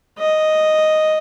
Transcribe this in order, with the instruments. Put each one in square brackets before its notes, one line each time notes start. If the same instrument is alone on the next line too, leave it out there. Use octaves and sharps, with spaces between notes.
[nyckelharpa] D#5